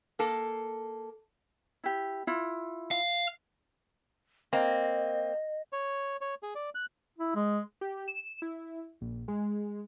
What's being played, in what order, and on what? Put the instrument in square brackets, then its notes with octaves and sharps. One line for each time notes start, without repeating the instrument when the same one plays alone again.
[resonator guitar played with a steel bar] A#3 A4
[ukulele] E4 G4
E4 F4
[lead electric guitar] F5
[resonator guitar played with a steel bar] A#3 C4 [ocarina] D#5
[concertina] C#5
C#5
G#4
D5
F#6
[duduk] E4
G#3
[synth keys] G4
E7
E4
A#1
G#3